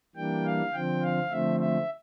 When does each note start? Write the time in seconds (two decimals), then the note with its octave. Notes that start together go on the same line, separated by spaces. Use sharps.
0.15 E3 G3 A#3 D4 G5
0.45 F5
0.73 D3 F3 C4 G5
1.02 F5
1.31 D3 F3 A3 C4 E5
1.60 E5